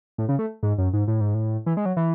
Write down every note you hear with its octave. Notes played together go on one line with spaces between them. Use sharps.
A2
C#3
A3
G#2
F#2
G#2
A2
G#2
A2
E3
G#3
F#3
E3